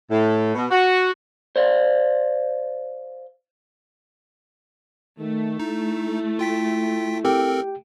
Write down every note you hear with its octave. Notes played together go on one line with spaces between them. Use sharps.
A2
B2
F#4
C5 D5 F5
D#3 A3
D#4 E4
F4 G5 B6
C4 G4 A4 A#4 G5